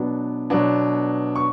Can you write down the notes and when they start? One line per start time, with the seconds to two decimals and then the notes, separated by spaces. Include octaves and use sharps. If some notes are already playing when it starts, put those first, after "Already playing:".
Already playing: B2 F#3 B3 D4
0.50 B2 F#3 B3 D4
1.36 C#6